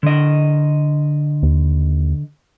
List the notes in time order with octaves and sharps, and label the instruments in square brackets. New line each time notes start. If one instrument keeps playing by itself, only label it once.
[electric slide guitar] D3 D#5
[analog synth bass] D#2